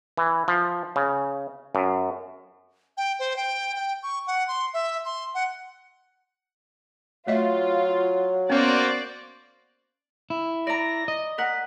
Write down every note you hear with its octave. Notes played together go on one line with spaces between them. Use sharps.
E3
F3
C#3
F#2
G5
C5
G5
G5
C#6
F#5
C6
E5
C6
F#5
F#3 A3 F4 D#5 E5
A#3 B3 C#4 F#4 C5 D5
E4
D5 A#5 A#6
D#5
A#4 F#5 B6